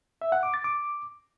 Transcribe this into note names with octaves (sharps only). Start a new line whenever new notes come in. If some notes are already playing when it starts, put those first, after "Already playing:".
E5
F#5
D6
A6
D6